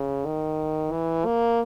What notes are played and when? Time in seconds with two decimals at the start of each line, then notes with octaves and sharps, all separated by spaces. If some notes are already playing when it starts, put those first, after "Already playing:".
Already playing: C#3
0.25 D#3
0.91 E3
1.25 A#3